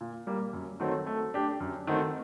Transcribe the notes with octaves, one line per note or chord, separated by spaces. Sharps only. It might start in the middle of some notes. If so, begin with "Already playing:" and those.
A#2
G3 A#3
F#2
D#3 F#3 A3 C4
A3
D4 G4
F#2
D#3 A3 C4 F#4